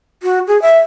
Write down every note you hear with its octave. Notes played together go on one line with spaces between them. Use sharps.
F#4
G#4
E5